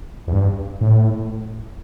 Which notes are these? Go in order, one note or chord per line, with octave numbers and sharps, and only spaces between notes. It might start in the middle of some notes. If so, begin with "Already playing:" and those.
E2
G2
A2